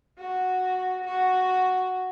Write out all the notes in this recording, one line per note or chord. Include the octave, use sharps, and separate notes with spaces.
F#4
F#4